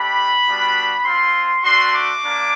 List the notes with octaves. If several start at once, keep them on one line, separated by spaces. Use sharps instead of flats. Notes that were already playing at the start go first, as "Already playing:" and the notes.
Already playing: A3 D4 G4 B5
G3 B3 D4 F#4
C4 F4 C6
A3 D4 F#4 C6
D6
A#3 D4